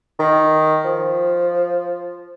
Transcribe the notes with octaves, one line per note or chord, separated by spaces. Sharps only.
D#3
F3